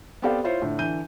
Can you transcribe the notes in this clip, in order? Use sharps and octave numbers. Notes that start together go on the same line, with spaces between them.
B3 C4 G4 A4 D5 F5
E4 F4 C5 C#5
A2 D3
D3 E3 G6 D#7